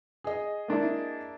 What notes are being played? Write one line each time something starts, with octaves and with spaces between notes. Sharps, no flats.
G#4 D#5
A#3 D4 E4